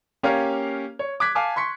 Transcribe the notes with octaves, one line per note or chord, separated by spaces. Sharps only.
A#3 C#4 G4 A#4 C#5 F5
C#5
D6 F#6 G#6 B6
F5 G#5 A5 D6
C6 C#6 B6 C#7